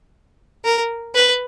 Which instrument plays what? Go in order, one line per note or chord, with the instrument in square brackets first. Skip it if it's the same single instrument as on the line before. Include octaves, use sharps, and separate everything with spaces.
[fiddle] A#4
B4